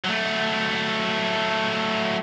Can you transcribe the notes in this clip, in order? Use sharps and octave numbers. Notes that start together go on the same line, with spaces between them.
F#3 A3